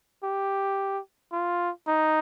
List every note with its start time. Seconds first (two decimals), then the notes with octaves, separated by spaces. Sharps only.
0.24 G4
1.32 F4
1.87 D#4